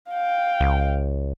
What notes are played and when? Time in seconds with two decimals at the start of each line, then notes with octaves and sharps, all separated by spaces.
0.10 F5 G5
0.61 C#2